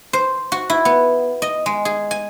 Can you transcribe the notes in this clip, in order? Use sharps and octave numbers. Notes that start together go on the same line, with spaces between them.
C5
F#4
E4
B3
D#5
G#3
G#4
G#5